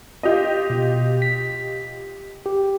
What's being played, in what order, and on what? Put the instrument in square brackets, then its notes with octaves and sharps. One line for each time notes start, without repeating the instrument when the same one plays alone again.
[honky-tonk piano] F4 G4 D#5
[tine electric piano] B2
B6
G4